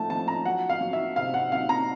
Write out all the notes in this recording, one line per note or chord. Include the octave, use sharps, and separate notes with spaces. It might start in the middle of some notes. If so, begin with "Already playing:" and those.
Already playing: F3 A3 A5
F3 A5
A#5
F#3 F#5
F5
F#3
E5
C3 F5
F#5
F#3 F5
A#5